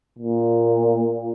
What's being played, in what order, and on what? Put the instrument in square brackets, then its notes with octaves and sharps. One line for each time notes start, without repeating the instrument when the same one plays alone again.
[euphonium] A#2